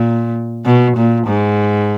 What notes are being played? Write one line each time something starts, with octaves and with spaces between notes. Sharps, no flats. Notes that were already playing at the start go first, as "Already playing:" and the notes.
Already playing: A#2
B2
A#2
G#2